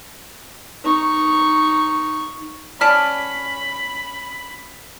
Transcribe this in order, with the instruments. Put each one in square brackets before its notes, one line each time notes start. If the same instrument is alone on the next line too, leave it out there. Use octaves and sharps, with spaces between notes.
[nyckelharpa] D#4 C#6
[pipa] C#4 D5 A5 [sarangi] B5 [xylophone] F6 B6